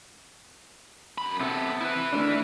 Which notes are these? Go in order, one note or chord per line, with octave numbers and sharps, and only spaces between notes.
F#2 B5
C3 B3 A4
E4 B4
D3 A3 D4